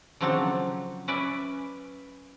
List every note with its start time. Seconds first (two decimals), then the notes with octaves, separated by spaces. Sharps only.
0.20 C#3 F3 F#3 C4 D4 A4
1.08 C#4 B4 D5 E5